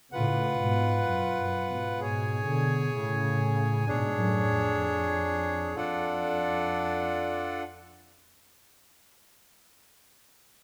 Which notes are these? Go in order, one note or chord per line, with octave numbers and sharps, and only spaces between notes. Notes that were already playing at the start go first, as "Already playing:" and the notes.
A2 C#3 F4 B4 F#5
G#2 B2
F#2
F#2
G#2 B2
G#2 B2 G#4 C#5 G#5
B2 D3
A2 C#3
G#2 B2 D4 G#4 C#5
F#2 A2
F2
F2 D4 F4 A4 D5 F#5